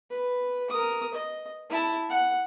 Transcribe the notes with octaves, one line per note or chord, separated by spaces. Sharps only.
B4
A#4 D#6
D#5
E4 A5
F#5